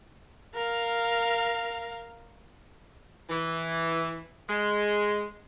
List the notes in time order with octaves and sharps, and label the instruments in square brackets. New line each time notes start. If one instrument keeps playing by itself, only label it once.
[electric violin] A#4 F5
[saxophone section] E3
G#3